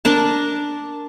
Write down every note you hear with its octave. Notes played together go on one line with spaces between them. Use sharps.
D4 A#4 A5